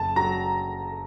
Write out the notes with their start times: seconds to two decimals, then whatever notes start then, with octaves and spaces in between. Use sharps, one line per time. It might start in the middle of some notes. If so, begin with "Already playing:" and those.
Already playing: F#1 A5
0.16 F#3 A#5